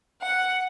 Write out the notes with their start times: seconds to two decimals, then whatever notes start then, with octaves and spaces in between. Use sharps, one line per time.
0.23 F#5